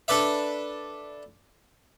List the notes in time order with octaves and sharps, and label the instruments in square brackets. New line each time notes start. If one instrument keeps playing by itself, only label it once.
[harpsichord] D4 A4 B4 D5 E5